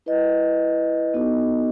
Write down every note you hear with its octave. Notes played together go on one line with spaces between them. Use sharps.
E4 B4 D#5
B3 D#4 F#4 A4 D#5